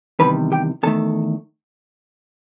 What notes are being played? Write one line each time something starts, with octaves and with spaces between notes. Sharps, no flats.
E2 C3 D#3 G3 B4 B5
G4 G5
E2 D#3 A3 A4 A5